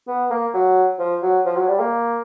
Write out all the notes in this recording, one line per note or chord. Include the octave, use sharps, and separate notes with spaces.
B3
A#3
F#3
F3
F#3
F3
F#3
G3
A#3